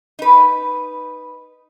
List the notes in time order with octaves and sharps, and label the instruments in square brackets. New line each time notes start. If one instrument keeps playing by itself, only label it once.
[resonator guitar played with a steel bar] D#4 B4